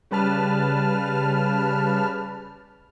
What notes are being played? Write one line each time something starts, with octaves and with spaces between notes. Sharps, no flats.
C#3 G3 B4 A5 F6